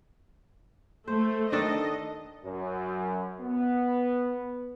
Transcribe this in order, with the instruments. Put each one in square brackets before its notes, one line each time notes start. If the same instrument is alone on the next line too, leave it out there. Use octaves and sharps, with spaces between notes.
[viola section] A3 [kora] C5
[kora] D#3 D4 A4 [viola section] D#5
[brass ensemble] F#2
B3